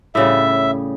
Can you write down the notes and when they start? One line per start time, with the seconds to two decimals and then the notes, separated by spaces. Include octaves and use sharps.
0.15 A2 C#3 G3 E5